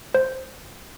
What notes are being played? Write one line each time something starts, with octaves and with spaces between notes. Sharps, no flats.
C5